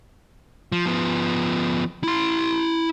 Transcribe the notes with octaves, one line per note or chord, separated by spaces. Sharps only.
F3
F3 B3
E4 C6